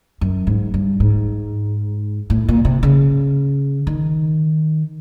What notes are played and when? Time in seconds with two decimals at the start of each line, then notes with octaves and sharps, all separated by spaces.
0.21 F#2
0.47 G#2
0.74 G2
1.00 G#2
2.30 A2
2.48 A#2
2.65 C3
2.83 C#3
3.87 D#3